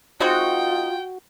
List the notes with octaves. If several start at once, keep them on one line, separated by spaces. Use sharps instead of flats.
G#3 C4 D#4 F4 F#4 G5